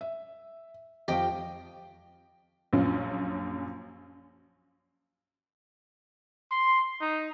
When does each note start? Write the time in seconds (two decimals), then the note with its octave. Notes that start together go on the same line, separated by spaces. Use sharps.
0.01 E5
1.08 F2 F3 G4 D#5 F5 G5
2.73 A#1 F#2 C#4 F4
6.51 C6
7.01 D#4